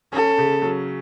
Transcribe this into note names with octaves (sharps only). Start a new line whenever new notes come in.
C#4 A4
C#3
F#3